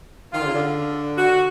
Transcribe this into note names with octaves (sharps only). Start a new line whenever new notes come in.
D#3 F4
D3
C#3
D3
F#4